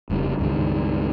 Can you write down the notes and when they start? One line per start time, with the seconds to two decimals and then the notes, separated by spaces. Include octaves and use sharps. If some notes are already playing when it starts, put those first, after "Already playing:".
0.10 F1 C#3 G3
0.39 C#2 G2 D#3